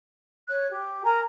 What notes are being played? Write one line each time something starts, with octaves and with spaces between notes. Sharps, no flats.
C#5 F#6
G4
A#4 G#5 A#5